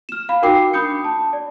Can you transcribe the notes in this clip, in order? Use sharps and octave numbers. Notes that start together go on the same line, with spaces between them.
F6 E7
F5 B5
D#4 F#4 A#4 G5 D6 C7
D4 B5 D#6 G6 C#7
A5
D5